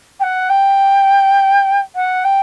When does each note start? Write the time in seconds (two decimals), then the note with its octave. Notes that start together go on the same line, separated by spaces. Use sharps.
0.20 G5
0.23 F#5
0.49 G5
1.95 F#5
2.24 G5